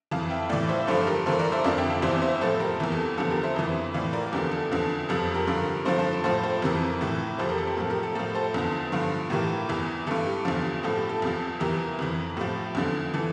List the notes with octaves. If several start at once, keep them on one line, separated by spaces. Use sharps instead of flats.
F2 E3 F5 A5
E5 G5
A2 E3 D5 F5
C5 E5
G2 D3 F3 A4 C5
G4 A#4
G2 E3 A4 C5
A#4 D5
C5 E5
F2 D3 F3 D5 F5
E5 G5
F5 A5
E2 C3 E3 C5 E5
C5 E5
A2 F3 A4 C5
G4 A#4
E2 C3 E3 G4
A4
G4
E2 D3 F3 A4
G4 A#4
C5 E5
F2 E3
A2 E3 D5 F5
A#4 D5
E2 D3 F3 G4
A4
E2 D3 F3
F2 C3 F3 A4
G4 A#4
G2 D3 F3
G2 D3 F3 A4 C5
A4 C5
A2 F3 A4 C5
A4 C5
F2 C3 E3 G4 A#4
A2 E3
F2 C3 F3 A4 C5
G4 A#4
A4
G4
A2 F3 A4
G4 A#4
A4
A2 F3 A4
A4 C5
E2 D3 F3
G2 D3 F3
A2 E3 G4 A#4
E2 E3
G2 E3 A4
G4
E2 D3 F3
A2 F3 A4
G4
A4
E2 C3 F3
E2 E3 G4 A#4
F2 E3
A2 F3 G4
E2 D3 F3
E3 A4